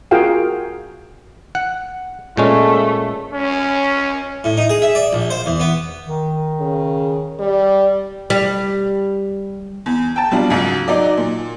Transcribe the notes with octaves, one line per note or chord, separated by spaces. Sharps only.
F4 F#4 G#4 A#4 F5 G5
F#5
A#2 G#3 A3 C#4
C#4
A2
D#4
G#4
E5
D5
A#1
C5
E2
B3
D#3
C#3
G3
G3
E2
G5 A5
B2 G3 D4 F4
C#2 G#2 F#3
F#3 D#4 D5
A#2